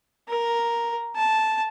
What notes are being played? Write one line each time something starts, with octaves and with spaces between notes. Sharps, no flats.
A#4
A5